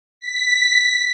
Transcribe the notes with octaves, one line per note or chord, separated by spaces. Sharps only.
B6